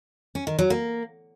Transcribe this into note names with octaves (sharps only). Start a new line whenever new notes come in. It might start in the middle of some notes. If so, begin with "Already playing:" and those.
C#4
D#3
F#3
A#3